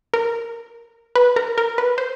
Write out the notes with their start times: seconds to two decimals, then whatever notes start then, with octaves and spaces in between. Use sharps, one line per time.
0.14 A#4
1.15 B4
1.36 A#4
1.58 A#4
1.78 B4
1.98 C5